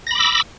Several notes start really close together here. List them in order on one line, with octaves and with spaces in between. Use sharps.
A#6 B5 D6 E6